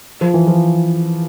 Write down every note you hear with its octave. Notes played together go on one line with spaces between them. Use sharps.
F3
E3
F3